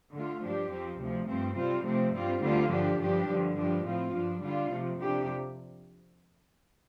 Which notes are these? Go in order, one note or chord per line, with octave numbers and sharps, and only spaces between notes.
D3 A3 F4
G2 F3 D4 G4
F2 F3 C4
D2 C3 F3
G2 F3 A3 C4
C3 G3 C4 F4
C3 F3 A3 C4
G2 G3 C4 F4
D2 D3 G3 C4 F4
G2 F3 D4 G4
G2 F3 D4 G4
G2 D3 F3
G2 F3 D4 G4
A2 F3 C4 F4
G2 F3 D4
D3 G3 D4 F4
C3 F3 A3
F2 C3 F3 D4 G4